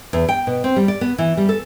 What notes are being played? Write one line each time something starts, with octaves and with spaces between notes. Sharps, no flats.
E2
G5
B2
C4
G3
D5
B3
E3
G3
A4